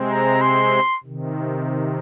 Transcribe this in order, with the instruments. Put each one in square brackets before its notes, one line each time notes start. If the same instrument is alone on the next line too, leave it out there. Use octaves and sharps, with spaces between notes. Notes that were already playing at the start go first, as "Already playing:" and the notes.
Already playing: [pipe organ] C3 G#3 C4
[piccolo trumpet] A#5
C6
[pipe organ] C3 D#3